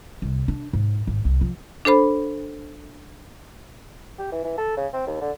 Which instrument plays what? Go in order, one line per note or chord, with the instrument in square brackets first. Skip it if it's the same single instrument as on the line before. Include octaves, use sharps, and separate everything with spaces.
[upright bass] C2
D4
G#2
G#1
C2
F3
[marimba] D4 A4 C5 B5
[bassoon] G4
E3
E3
A4
C#3
C4
D#2
D3